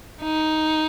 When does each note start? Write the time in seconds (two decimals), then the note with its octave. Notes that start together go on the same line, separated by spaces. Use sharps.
0.22 D#4